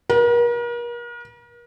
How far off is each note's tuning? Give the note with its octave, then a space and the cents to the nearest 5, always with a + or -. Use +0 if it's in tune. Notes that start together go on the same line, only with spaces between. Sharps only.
A#4 +40